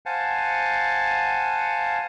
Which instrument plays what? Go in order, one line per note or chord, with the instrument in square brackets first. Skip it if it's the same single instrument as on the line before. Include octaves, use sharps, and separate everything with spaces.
[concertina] C5 F5 F#5 G#5 A5